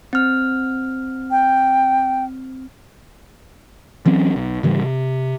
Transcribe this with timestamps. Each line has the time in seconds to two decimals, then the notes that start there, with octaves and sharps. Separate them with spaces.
0.13 C4 F6
1.31 G5
4.06 E3 F#3 C4 C#4
4.36 B1
4.63 G#2 C#3 E3 G3
4.81 C3